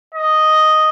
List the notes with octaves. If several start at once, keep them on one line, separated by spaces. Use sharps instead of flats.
D#5